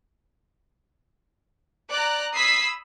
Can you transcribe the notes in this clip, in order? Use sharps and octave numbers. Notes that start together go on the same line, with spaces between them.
D5 A#5 F#6
B5 D#6 E6 G#6 B6 C7